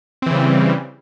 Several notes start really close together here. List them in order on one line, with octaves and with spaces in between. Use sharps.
C4 E3 C#3 G3